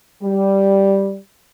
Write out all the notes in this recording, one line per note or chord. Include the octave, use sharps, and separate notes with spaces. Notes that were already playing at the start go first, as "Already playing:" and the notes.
G3